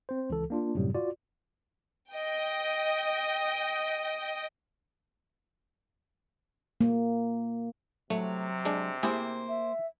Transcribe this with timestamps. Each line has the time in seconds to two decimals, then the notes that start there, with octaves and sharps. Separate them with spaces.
0.09 C4 C5
0.30 C#2 E3 A4
0.50 A#3 D4 F4
0.75 F#2 A2 C3 F#3 G3
0.95 F4 F#4 D5
2.12 D#5 G5
6.81 A#3
8.10 C3 F#3 A3
8.65 G#3 D4
9.03 A#3 E4 G4 G#4 C5
9.48 E5